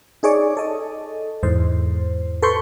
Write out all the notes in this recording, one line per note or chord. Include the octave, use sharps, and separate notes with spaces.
D#4 G#4 C#5 D5
A4 D#5
E2 G#2 C5
A4 B4 C6 C#6 G6